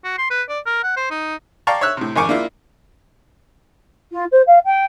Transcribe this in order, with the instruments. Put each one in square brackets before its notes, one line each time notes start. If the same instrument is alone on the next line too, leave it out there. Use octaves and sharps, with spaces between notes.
[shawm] F#4
C6
B4
D5
A#4
F#5
C5
D#4
[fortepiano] D5 F5 G5 A5 A#5 C#6
C#5 E5 E6 F#6
A2 C3
G#1 F2 A#4 G#5 C#6 D6
A#3 D4 E4 F4
[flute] F4
C5
F5
G5